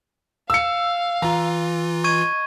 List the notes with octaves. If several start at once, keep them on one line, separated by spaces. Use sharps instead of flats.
F5 E6 C#7
E3 F4 A#5
D#5 C#6 G#6 D#7